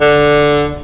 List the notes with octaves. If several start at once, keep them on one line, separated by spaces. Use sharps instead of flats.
D3